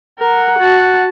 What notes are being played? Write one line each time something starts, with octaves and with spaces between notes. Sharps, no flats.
A#4 F#5
F#4 A5